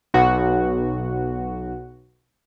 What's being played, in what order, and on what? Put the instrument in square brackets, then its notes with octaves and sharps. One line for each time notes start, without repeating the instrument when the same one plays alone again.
[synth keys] B1 F#4